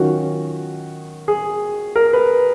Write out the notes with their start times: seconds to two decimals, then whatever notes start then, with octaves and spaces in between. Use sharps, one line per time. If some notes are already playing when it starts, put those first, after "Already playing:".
Already playing: D#3 F#3 C#4 F4 F#4
1.28 G#4
1.96 A#4
2.13 B4